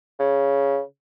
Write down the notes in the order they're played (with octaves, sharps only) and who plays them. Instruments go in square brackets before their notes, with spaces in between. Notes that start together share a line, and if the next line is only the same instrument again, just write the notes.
[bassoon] C#3